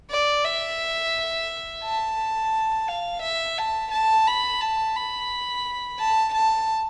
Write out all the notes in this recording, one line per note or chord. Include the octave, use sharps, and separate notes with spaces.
D5
E5
A5
F5
E5
A5
A5
B5
A5
B5
A5
A5